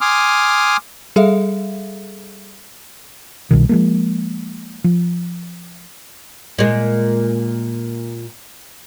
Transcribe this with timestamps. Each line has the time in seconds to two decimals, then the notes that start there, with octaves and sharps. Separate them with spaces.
0.01 G#5 C6 D6 D#6 F6
1.16 G3 G#4 A4 E5 F5
3.51 C2 B2 D#3
3.69 F3 G#3 A#3
4.84 F3
6.58 A#2 G#3